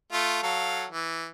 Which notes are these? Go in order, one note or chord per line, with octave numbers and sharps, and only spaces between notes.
A3 F4
F#3 A4 F5
E3